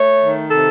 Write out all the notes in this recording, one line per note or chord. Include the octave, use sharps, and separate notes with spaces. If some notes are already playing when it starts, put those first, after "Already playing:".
Already playing: A3 C#5
D#3
C3 A4